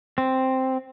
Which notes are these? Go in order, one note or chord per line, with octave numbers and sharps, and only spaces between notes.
C4